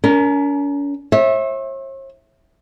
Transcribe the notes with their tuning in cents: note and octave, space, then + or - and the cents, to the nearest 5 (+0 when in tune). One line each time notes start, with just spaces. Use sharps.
C#4 +45 A#4 +0
C#5 -45 E5 -10